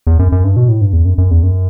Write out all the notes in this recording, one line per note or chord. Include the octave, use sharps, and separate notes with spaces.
E2
F#2
F#2
G2
B2
A2
G2
E2
F#2
F#2
E2
F#2